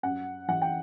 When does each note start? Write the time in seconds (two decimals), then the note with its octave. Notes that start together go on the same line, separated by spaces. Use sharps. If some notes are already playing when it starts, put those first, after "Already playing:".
0.03 F#2 F#5
0.48 E3 F#5
0.62 G5